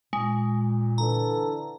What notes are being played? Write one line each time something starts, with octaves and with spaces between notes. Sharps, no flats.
A#2 G#3
D3 E3 A4 A#5